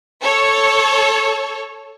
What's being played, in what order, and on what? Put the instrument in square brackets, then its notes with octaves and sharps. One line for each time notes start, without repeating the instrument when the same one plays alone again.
[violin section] A4 C#5